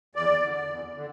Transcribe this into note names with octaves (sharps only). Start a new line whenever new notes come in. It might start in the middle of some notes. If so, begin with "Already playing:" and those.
E2 D5
D3
E2
D3